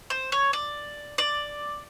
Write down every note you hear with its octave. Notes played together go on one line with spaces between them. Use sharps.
C5
C#5
D5
D5